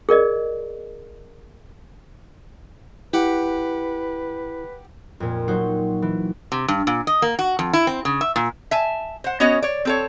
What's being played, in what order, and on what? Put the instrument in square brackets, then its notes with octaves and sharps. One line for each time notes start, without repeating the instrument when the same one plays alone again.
[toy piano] G#4 A#4 D5 D#5
[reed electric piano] E4 [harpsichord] G4 F#5 [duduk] B4
[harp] F2 A#2
F#3 D#4 F#4 C5
E3
[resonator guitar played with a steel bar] C3
G2
A#2
D#5
A#3
F#4
F2
E4
C4
C#3
E5
A#2
E5 G#5 A5
C5 F#5
B3 C#4 F#4 C#5 D#5
C#5 D5
C4 A4 C#5